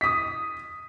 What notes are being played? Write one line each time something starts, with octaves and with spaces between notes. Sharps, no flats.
D#6 B6